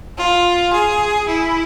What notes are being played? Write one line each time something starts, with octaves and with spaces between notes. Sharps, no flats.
F4
G#4
E4